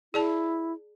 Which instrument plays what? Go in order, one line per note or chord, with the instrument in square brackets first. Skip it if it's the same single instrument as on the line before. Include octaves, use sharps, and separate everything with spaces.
[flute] E4 [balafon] G#4 D5 A5